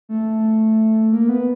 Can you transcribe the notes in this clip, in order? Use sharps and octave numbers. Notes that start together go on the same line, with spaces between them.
A3
A#3
B3